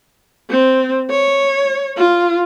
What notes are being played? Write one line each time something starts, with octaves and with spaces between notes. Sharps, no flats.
C4
C#5
F4